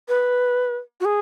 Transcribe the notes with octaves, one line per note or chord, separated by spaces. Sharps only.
B4
F#4
G#4